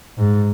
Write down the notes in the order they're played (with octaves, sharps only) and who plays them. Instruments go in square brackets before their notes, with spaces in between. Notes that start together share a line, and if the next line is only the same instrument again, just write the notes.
[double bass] G#2